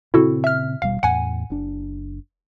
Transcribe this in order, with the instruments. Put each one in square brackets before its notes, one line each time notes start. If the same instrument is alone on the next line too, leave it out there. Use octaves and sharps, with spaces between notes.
[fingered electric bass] A#2 C#3 C4 [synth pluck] E4 F#4 A4
[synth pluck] E5 F6
[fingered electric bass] D#1 B2 G3 [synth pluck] F5
[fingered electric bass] E2 A2 [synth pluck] F#5 G#5
[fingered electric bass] F#1 D4